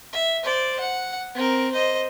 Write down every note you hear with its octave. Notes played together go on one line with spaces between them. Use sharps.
E5
C5 D5
F#5
C4 A#4
C5 D#5